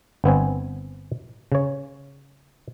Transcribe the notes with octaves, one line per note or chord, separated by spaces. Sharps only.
G1 B3 C4 G#5
C#3 C#5